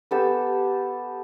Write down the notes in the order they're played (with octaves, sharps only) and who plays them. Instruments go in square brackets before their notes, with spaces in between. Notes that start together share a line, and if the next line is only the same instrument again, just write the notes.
[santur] B3 G4 A4 E6